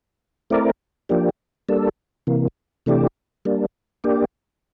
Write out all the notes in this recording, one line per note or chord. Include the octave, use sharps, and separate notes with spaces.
A3 C4 E4 A#4 D5
F3 A#3 D4 G4
G3 A#3 D4 A4
C3 E3 A#3
C3 E3 A3 D4 G4
G3 A#3 D4
A#3 D4 G4